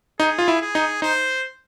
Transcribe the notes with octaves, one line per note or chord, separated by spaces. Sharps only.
D#4 G#4
F4
E4
G#4
D#4
D#4 C5